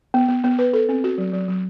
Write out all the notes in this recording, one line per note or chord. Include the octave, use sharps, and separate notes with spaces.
B3
B3
B3
B4
A4
C4
F#4
F#3
F#3
F#3